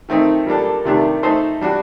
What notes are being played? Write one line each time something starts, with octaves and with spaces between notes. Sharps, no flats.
D#3 A3 C4 D#4
G3 A#3 D4 A4
C3 D#3 A3 D4 G4
A3 D#4 A4 C5
G3 D4 F#4